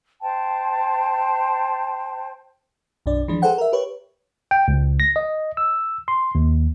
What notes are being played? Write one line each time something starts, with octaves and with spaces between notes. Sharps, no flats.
C5 G5 A5
B1 F#2 D4 D5
E3 F3 G#3 D4
G#4 A4 B4 C5 F#5 G5
A#4 E5
G4 B4 C#5
G5
C#2
A#6
D#5
E6
C6
D#2